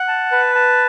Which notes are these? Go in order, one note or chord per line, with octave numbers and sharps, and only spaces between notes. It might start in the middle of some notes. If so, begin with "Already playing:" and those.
Already playing: F#5
A5
B4
A5